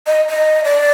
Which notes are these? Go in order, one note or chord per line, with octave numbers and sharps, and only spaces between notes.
D#5
D#5
D5